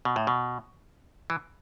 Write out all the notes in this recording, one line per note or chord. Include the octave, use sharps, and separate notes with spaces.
B2
A2
B2
E3